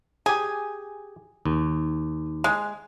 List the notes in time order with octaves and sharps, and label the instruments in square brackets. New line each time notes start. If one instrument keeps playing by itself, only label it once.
[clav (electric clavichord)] G4 G#4 [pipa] G#5
[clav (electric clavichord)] D#2
[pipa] G#3